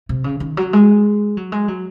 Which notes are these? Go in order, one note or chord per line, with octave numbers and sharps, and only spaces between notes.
C3
C#3
D#3
F#3
G#3
F#3
G#3
F#3